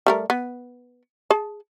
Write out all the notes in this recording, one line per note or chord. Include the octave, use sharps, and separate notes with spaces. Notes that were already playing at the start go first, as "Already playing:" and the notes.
G3 A3 A#4
B3
G#4 A5